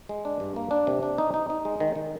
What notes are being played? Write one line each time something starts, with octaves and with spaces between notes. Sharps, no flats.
G#3
D4
G2
A#3
D4
C3
D4
D#4
D#4
D#4
G#3
D#3
D#3